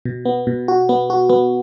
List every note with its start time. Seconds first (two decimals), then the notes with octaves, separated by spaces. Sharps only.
0.05 B2
0.25 B3
0.47 B2
0.68 F#4
0.89 B3
1.10 F#4
1.29 B3